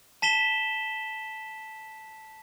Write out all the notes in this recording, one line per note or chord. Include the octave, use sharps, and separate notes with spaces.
A5 B6 E7 G7